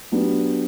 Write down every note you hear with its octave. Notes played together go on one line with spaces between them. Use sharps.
F#3 B3 D4 G4